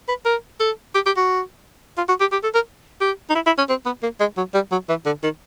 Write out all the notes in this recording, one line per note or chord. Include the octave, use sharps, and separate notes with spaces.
B4
A#4
A4
G4
G4
F#4
F4
F#4
G4
G4
A4
A#4
G4
D#4
E4
E4
C#4
C4
B3
A#3
G#3
F#3
G3
F#3
E3
D3
D#3